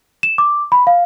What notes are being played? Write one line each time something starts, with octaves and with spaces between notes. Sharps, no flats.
E7
D6
B5
F5